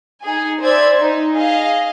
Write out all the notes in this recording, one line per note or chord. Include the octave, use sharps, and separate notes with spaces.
D#4 G#4 G#5
C5 D5 E5 G#6
D#4
G#4 D#5 F5